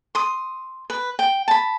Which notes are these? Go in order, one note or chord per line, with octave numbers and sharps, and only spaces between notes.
C6 D#6
B4
G5
A5 B5